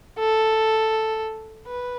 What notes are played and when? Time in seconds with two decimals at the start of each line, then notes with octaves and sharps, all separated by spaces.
0.19 A4
1.66 B4